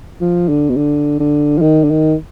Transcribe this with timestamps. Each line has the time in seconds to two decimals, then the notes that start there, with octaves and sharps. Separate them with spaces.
0.21 F3
0.49 D3
0.70 B2
0.77 D3
1.20 D3
1.58 F3
1.62 D#3
1.84 D3
1.90 D#3